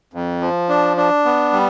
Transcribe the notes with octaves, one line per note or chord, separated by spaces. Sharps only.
F2
F3
D4
D4
B3
G3